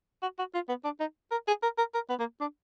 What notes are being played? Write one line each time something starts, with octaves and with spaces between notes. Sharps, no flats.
F#4
F#4
F4
B3
D4
D#4
A#4
G#4
A#4
A#4
A#4
B3
A#3
D4